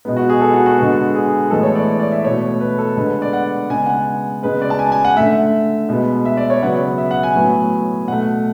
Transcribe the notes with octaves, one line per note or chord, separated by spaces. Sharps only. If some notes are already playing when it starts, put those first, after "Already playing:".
B2 G#3 B3
F#4
G#4
A4
F#4
F#4
D3 G#3 B3
G#4
A2 E3 G#3 B3 A4
C#5
D5
D5
E5
B2 A3 C#5
B4
A4
D3 G#3 B3 B4
D5
F#5
C#3 G#3 B3 G#5
F#5
G#5
C#3 G#3 B3 B4
D5
A5
G#5
G#5
F#5
D3 A3 E5
B2 G#3 B3
E5
D5
C#5
C#3 F#3 B3 F#5
E5
F#5
G#5
A2 F#3 B3
B2 A3 F#5